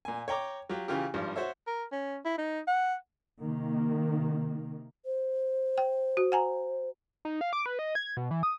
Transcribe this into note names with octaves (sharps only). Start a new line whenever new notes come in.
A#2 G#5
C#5 G5 A#5 D6
F#3 F4 G4
C#3 E3 F4 G4
G#1 G2 F3 G3
F#4 C5 C#5 E5
A#4
C#4
E4
D#4
F#5
C3 D#3 A#3
C5
G5
F#4
F#5 G#5 A#5
D#4
F5
D6
B4
D#5
G#6
B2
E3
D#6